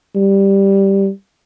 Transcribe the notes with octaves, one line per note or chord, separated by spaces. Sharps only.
G3